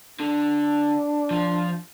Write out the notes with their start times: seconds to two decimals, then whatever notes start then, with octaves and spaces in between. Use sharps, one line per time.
0.20 D3 D4
1.31 F3